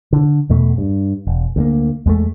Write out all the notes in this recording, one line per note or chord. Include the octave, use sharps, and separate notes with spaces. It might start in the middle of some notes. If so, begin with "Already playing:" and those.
D3
E2 B2 A3
G2
E1
D2 G#3 A#3
E2 G#3 A3